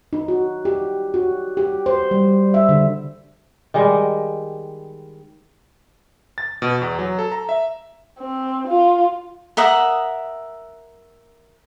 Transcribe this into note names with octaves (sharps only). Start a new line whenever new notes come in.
D#4
F#4
G4
F#4
G4
C5
G3
E5
D3
D#3 G3 G#3
A6
B2
E2
F#3
A4
A#5
E5
C4
F4
A#4 E5 F#5 D#6